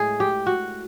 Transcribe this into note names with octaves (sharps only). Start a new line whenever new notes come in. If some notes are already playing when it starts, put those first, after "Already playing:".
Already playing: A2 G#3 G#4
G4
F#4